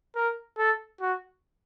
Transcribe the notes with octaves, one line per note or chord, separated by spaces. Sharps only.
A#4
A4
F#4